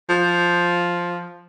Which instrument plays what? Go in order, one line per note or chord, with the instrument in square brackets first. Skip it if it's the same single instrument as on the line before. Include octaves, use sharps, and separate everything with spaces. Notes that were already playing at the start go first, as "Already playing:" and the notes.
[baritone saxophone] F3